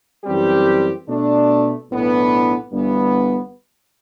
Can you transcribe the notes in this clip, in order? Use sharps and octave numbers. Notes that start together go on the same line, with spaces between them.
F#2 E3 G3 C4 G4
B2 A3 D4
B1 A2 E3 B3 D4
G1 G2 E3 B3